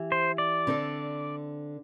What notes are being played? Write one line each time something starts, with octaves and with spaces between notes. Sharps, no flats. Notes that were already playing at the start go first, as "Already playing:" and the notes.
Already playing: E3 G4
C5
D5
D3 C4 A4